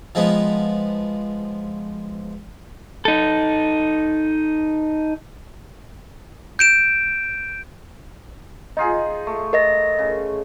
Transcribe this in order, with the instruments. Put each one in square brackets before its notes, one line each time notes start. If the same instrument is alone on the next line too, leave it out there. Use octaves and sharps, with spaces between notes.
[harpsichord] F3 G#3 B3
[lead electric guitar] D#4 A4
[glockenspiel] G6 D7 E7
[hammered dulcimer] D#4 F4 G#4 [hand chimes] D#5
[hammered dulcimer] A3
[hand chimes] A#4 D#5 A#6
[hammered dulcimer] C#3